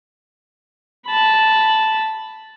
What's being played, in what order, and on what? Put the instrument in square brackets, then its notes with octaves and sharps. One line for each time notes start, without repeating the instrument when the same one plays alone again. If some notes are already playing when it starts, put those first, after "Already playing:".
[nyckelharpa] A5 B5